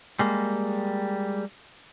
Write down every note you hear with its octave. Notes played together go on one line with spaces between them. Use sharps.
G3 G#3 A#3